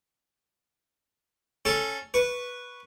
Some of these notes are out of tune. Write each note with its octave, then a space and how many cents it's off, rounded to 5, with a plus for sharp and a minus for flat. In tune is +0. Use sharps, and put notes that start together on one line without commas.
C#4 +0 A4 +0 C#6 -35
B4 -5 C#6 +0